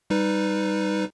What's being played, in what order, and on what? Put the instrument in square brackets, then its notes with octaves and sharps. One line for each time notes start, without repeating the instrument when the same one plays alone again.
[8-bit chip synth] G3 D#4 B4